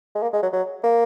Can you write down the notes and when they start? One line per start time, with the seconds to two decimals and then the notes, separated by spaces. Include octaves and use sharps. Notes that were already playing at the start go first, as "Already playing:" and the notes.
0.15 G#3
0.23 A#3
0.33 G#3
0.43 F#3
0.53 F#3
0.84 A#3